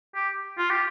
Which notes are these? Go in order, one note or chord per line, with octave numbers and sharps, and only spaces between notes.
G4
F4
G4